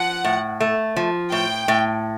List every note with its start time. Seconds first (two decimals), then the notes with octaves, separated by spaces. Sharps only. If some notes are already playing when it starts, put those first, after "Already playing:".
Already playing: F3 F#5
0.25 A2
0.60 A3
0.96 F3
1.32 A2 G5
1.68 A2